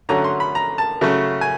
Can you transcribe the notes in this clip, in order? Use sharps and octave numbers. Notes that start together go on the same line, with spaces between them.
D3 F#3 A3 C#4 A#5
C6
B5
A#5
A5
C#3 F#3 A3 C#4
G#5